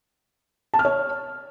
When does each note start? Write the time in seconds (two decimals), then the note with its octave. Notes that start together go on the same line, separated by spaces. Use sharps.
0.74 A5
0.79 F6
0.85 C#5